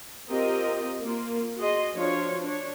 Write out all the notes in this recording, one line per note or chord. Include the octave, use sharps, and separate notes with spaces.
C4 F4 G4 A#4 D#5
A#3 F4
F#4 G#4 D#5 C6
F3 D4 F4 F#4 C#5
D4 C#5